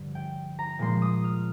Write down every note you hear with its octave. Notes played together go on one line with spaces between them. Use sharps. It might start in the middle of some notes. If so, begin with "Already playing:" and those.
Already playing: G2 D3 F3
G5
A#5
A#2 F3 G#3 C6
D#6
F6